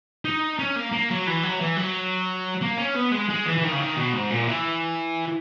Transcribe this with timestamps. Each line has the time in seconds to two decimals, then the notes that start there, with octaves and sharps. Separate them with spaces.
0.25 D#4
0.59 C#4
0.76 A#3
0.92 A#3
1.10 F#3
1.27 E3
1.43 F#3
1.61 E3
1.77 F#3
2.62 A#3
2.78 C#4
2.96 B3
3.12 G#3
3.30 G#3
3.46 E3
3.58 E3
3.64 D#3
3.72 C#3
3.80 D#3
3.97 B2
4.14 G#2
4.30 A#2
4.47 E3